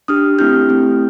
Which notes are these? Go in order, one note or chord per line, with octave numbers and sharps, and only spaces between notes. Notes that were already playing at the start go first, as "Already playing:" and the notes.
D4 G4 D#6 F6
A3 C4 E4 G4 F6 G6
A3 C4 E4 G4